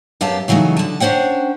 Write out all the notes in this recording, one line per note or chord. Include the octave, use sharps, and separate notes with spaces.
F#2 B3 G4 F5 A5
C#3 E3 F#3 A3 D#4
D3 A5
C#4 D4 C5 F#5 G5